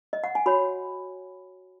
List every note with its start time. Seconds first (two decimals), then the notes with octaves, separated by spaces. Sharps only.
0.13 D#5
0.24 F#5
0.35 G#5
0.46 F#4 C#5 B5